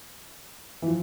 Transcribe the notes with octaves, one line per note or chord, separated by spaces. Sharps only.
E3
F3